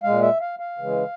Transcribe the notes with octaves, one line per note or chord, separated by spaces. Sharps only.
A#2 G#3 F5
E5
F5
F5
C#3 E3 G#3